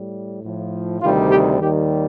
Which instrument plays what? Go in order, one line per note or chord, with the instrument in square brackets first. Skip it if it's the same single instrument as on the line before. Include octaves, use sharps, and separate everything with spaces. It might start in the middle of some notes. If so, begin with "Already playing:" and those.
Already playing: [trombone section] A2 G3
A2 F3
D2 C3 D#3 G3 F4
G4
D#2 D#3 G3 G4